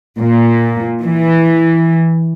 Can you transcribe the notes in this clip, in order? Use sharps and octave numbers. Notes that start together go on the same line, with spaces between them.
A#2
E3